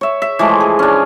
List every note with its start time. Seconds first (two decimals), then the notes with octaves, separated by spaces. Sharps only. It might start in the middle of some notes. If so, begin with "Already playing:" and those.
0.01 C#5 E5
0.22 E5
0.39 E3 F3 G#3 A3
0.60 G#4
0.79 C#4 D4